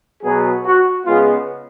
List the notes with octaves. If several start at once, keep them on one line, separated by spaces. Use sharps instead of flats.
B2 F#3 B3 G#4
F#4
C#3 G#3 B3 F4